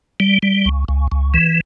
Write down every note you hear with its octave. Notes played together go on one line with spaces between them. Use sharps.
G3
G3
C#2
C#2
C#2
E3